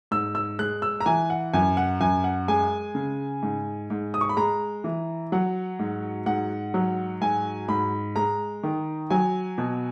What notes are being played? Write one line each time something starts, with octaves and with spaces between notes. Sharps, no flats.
G#2 E6
E6
G#3 F#6
E6
A#5
E3 G#5
F#5
F#2 G#5
F#5
F#2 G#5
F#5
G#3 G#5
C#3
G#2
G#2
D#6
C#6
B5
G#3 A#5
E3
F#3 F#5
G#2
G#2 F#5
F#3
G#2 G#5
G#2 B5
G#3 A#5
D#3
F#3 G#5
B2